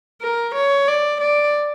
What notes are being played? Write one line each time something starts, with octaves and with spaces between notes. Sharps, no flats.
A#4
C#5
D5
D5